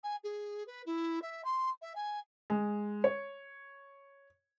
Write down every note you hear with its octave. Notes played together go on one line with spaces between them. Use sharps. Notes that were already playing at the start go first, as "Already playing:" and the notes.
G#5
G#4
B4
E4
E5
C6
E5
G#5
G#3
C#5